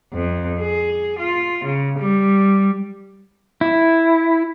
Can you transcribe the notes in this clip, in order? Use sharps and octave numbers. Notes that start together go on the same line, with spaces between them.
F2
G#4
F4
C#3
G3
E4